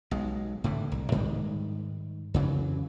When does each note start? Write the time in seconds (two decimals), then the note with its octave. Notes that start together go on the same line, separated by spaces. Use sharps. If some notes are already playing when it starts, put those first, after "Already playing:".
0.11 B1 G#3
0.64 A2 D3 E3
0.92 C2
1.12 G#2 D#3 G3 G#3
2.34 F2 C#3 E3 F#3